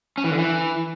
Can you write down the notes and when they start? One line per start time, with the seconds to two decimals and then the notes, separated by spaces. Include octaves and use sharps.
0.18 C#4
0.24 E3
0.31 D3
0.38 E3